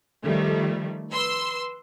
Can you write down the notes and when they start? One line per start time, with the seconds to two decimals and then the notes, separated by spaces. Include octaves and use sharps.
0.24 D#3 F3 G3 A3
1.11 B4 C6 E6